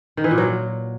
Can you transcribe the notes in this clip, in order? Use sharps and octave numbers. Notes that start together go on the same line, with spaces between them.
D#3
E3
A#2
F#3